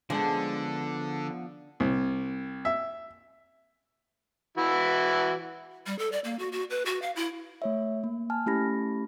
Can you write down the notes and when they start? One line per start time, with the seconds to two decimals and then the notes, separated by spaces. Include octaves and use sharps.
0.10 D3 F3 G#3 B3 D4 C5 F#5 A5
1.80 C2
2.65 E5
4.57 E3 E4 F#4
5.86 G3
5.99 A4
6.12 D5
6.24 A#3
6.39 F#4
6.52 F#4
6.70 B4
6.86 F#4
7.02 F5
7.16 E4
7.62 A3 C#5 E5
8.04 A#3
8.30 G#5 A5 F6
8.46 A3 C#4 E4 G4 B5 A#6